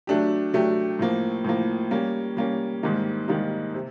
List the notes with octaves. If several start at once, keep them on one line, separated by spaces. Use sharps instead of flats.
F#3 A3 D4 G4
F#3 A3 D4 G4
A2 F3 A#3
A2 F3 A#3
G3 A#3 C#4
G3 A#3 C#4
G#2 D#3 G3 A#3 D#4
G#2 D#3 G3 A#3 D#4
C3